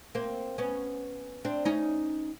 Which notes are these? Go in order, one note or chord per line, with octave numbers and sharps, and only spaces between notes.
A#3 C4
B3 C#4
C4 D4
C#4 D#4